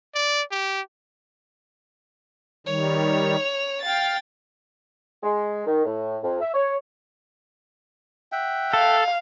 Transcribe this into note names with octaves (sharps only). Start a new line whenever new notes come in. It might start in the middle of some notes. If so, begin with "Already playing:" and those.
D5
G4
D#3 G3 C#5 F7
F5 G5 A6
G#3
D#3
A2
F2
E5
C#5
E5 F#5 G5
A4 F5